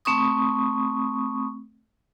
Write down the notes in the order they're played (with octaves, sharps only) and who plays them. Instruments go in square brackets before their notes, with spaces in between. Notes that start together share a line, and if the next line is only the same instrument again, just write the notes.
[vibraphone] A3 C4 B5 C#6 D#6